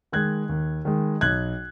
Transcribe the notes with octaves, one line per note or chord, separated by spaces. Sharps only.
D#3 G#3 F#6 G#6
D#2
D#3 G#3
B1 F#6 G#6